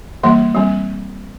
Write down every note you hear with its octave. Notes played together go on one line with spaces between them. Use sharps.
E3 G3 A#3 C6
G3 C4